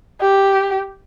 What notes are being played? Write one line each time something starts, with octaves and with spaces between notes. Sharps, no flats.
G4